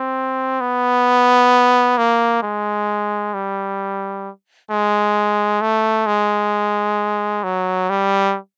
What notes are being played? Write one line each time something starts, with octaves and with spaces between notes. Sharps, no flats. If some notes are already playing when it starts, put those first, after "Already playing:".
Already playing: C4
B3
A#3
G#3
G3
G#3
A3
G#3
F#3
G3